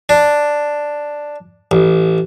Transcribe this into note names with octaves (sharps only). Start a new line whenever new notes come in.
D4
A1